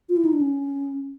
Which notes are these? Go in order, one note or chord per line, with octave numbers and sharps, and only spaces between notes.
F4
E4
D#4
D4
C#4